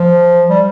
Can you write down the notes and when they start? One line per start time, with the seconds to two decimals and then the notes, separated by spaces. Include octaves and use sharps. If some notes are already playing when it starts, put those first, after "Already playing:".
Already playing: F3
0.50 G3